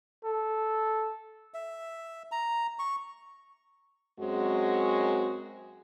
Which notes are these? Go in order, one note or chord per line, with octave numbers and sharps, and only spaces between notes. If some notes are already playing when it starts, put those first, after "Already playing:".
A4
E5
A#5
C#6
F#2 G#3 C4 F#4